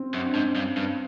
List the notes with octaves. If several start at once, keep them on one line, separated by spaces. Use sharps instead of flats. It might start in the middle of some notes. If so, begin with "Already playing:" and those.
Already playing: C4 C#4
F#2
D4
G#2 C#4
G2
G2